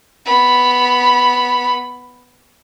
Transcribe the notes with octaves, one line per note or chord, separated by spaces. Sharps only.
B3 B5